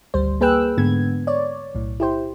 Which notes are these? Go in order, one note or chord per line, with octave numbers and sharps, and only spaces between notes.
G#1 D2 G3 C5
A#3 G#4 B4 G5 E6 F#6
G#2 D3 B3 G#6
C#5 D5
B1 A2
E4 G4 C5